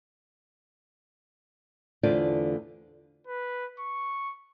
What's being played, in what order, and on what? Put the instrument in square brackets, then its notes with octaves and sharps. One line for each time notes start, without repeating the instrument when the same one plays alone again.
[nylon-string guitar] E2 D3 A3 F4 C5 D5
[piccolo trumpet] B4
C#6